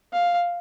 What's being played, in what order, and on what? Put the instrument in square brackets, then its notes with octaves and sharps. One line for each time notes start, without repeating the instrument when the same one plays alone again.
[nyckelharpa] F5